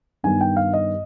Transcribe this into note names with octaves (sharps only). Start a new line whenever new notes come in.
G2 D#3 G3 B3 G#5
G5
F5
D#5